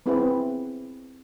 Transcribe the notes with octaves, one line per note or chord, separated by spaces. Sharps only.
B3 C4 E4 G#4 B4